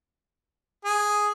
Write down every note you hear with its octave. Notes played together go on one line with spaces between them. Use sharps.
G#4